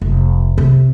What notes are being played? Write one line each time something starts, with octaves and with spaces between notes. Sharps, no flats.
F1
C3